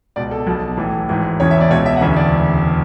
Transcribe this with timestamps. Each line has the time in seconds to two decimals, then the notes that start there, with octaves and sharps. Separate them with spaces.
0.16 C#2 B2 D5
0.31 A4
0.47 B1 B2 A4
0.77 A1 A2 E3
1.09 G#1 G#2 E3
1.40 E1 E2 C#3 E3 C#5
1.51 E5
1.61 D5
1.70 C#2 B2 C#5
1.86 E5
1.96 F#5
2.01 E1 D2 C#3 E3 E5
2.16 D5